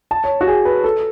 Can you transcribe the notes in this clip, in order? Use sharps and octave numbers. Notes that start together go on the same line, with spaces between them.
A5
C#5
F#4
G#4
B4
A4